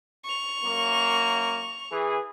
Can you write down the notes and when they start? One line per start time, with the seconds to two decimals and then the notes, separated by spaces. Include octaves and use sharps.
0.25 C#6 F7
0.64 F#2 A#3
1.92 E3 G#4